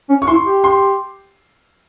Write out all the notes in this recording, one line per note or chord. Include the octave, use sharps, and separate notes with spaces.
C#4
C#6
E4 C6
G4
C6